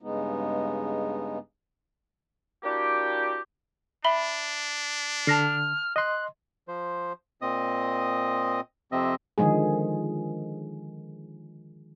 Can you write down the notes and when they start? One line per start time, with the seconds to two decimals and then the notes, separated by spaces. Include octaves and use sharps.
0.02 G2 C#3 G#3 B3 D#4
2.63 A#3 D4 E4 F#4 G4
4.04 D4 E5 B5 G7
5.27 D3 A5 F6 A#6 C7
5.96 D#5 C6 F#6
6.68 F3 C5
7.42 A#2 C4 D#5 D#6
8.92 F2 C3 C4 D#5 E5
9.38 D3 D#3 F3 G#3 G#4